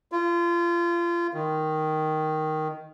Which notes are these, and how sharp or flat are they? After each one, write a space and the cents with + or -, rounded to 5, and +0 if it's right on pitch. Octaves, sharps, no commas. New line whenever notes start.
F4 -30
D#3 +0